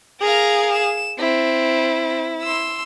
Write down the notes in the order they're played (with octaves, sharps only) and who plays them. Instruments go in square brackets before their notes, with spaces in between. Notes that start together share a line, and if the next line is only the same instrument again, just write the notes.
[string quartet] G#4 F5 [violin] A#4 A#5
[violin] E7
[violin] C4 [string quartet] E4
[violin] C6 E6